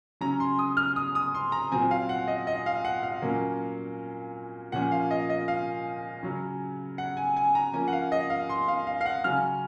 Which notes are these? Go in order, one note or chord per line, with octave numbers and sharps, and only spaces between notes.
C#3 F#3 C#4 A#5
C6
D#6
F6
D#6
D#6
C6
A#5
A#2 F#3 C4 G#5
F5
F#5
D#5
D#5
F5
F#5
F5
A#2 F#3 A#3 C#4
A#2 F3 A#3 C#4 F#5
F5
D#5
D#5
F5
C#3 F#3 C#4
F#5
G#5
G#5
A#5
F3 A#3 C#4 G#5
F#5
F5
D#5
F5
C6
F5
F5
F5
F#5
C#3 F#3 C#4 F6